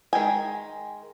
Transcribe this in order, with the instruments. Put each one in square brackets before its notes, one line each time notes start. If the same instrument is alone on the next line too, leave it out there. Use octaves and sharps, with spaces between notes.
[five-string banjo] D#3 G#3 G5 G#5